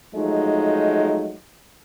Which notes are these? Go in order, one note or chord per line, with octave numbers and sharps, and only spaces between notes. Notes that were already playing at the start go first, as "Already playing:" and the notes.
F3 F#3 G#3 A3 D#4